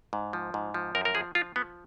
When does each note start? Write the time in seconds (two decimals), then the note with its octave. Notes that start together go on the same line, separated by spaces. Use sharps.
0.13 G#2
0.33 F3
0.54 G#2
0.74 F3
0.95 F#2 A#4
1.05 A#4
1.15 F3 G#4
1.35 F3 F4
1.56 F3 B3